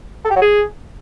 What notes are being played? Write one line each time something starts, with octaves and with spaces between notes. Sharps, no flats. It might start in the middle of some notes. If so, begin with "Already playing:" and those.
A4
G4
F#3
G#4